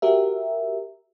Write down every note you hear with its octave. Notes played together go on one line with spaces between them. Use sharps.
F#4 G4 A#4 E5